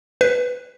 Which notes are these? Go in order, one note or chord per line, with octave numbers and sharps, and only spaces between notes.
B4